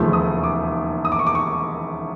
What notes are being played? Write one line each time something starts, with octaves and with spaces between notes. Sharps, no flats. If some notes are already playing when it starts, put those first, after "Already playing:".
Already playing: E1 D#2 C#3 F3 A3
D#6
D6
D#6
D6
C#6
D6
C#6